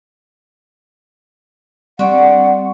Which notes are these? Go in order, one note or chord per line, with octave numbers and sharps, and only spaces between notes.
G3 C4 D4 D5 F#5 C#6